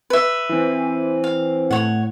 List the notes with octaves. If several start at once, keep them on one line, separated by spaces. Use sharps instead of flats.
B4 E5
E3 C4
F5
A2 C#5 F#5